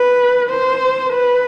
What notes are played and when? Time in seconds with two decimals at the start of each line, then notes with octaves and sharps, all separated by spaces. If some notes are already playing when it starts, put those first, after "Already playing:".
Already playing: B4
0.49 C5
1.13 B4